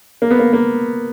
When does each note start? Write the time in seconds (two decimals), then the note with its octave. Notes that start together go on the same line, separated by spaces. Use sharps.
0.22 A#3
0.31 B3
0.39 A#3
0.53 A#3